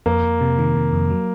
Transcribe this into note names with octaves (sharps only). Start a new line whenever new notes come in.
F2 A#3
F2
C3
D#3
C3
F2
F#3